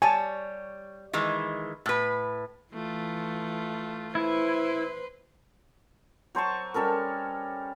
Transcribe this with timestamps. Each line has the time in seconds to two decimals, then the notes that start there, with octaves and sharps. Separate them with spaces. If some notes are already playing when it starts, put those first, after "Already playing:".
0.02 G3 C#5 G#5 A5
1.13 D#3 E3 G#3
1.86 A2 B4
2.74 E3 A3 F4
4.15 E4 B4 C5
6.35 F#3 C5 A5 C#6
6.74 G3 C#4 A4 A#4